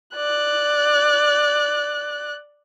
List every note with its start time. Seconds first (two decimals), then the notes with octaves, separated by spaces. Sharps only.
0.16 D5 F#6